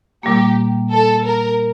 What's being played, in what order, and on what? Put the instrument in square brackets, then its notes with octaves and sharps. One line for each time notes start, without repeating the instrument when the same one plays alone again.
[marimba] A#2 G3 A#3 [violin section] G4
[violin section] A4
A#4